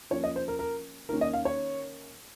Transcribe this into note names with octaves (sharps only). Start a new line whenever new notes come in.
F3 A#3 C#4 C#5
D#5
C5
A#4
A#4
D#3 A#3 C#4 A#4
D#5
F5
C#5